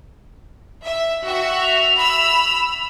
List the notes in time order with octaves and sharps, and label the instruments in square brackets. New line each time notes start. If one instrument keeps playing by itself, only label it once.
[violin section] E5
[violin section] F#4 E5 [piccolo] G5
[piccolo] F7
[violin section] B5 E6